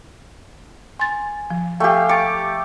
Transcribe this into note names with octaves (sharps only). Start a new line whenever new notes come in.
G#5 C6 A6
F3
A3 G4 F5 G5 G#5
C#6 D6 A6 C#7